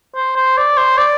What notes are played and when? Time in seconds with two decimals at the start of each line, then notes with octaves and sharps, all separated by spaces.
0.16 C5
0.36 C5
0.57 D5
0.77 C5
0.98 D5